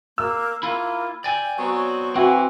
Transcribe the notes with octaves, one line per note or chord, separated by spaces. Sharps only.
A#3 E6
A#3 E4 F4
D5 G5 G#5
F#3 B3 C4 C#6
E3 C4 F#4